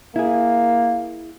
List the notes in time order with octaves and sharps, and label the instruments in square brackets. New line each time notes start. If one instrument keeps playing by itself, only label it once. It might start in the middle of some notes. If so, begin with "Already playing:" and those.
[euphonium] A#3 [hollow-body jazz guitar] E4 G#4